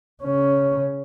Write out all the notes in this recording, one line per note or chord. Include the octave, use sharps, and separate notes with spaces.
C#3 C#4